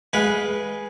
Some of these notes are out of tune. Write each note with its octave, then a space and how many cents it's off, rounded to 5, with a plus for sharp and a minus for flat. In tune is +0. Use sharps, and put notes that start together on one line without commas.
G#3 +0 B4 -10 F5 +25